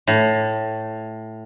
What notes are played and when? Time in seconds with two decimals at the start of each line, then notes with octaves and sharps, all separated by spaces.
0.07 A2